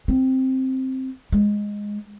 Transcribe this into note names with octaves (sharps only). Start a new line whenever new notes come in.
C4
G#3